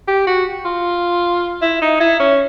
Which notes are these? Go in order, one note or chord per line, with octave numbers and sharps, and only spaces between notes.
G4
F#4
F4
E4
D#4
E4
C#4